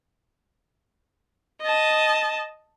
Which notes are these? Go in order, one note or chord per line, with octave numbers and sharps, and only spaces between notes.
D#5 A5